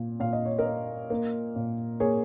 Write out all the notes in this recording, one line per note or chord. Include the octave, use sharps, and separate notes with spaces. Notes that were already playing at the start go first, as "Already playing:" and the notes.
Already playing: A#2
A#2 F5
D#5
C#5
A#4 D#5
A#3
A#3
A#2
A#3 G#4 C#5